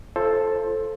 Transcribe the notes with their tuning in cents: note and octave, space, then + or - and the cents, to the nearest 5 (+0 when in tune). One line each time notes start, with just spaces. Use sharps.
F4 -30 A4 +0 C5 +20